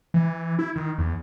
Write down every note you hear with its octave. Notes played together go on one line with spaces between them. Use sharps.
E3
E4
D#3
E2